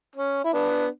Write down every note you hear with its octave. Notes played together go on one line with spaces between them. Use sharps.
C#4
E4
B3 D4